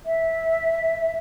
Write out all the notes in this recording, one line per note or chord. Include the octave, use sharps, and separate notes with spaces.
E5